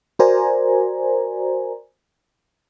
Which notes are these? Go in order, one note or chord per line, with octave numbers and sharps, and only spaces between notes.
F#4 A#4 C5 D5 G#5 A#5